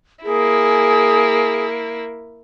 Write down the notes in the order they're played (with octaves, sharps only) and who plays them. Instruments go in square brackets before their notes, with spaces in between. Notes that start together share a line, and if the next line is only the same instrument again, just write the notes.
[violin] A#3 E4 [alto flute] G#4